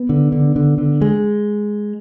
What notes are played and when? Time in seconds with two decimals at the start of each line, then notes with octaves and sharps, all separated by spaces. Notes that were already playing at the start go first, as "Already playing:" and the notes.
Already playing: B3
0.09 D3
0.32 D3
0.56 D3
0.78 D3
1.01 G#3